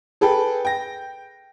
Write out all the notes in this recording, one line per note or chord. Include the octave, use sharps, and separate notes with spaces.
G#4 A4 B4 G5
G5 A#6